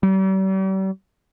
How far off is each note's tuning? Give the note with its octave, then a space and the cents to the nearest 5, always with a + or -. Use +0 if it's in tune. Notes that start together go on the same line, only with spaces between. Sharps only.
G3 -40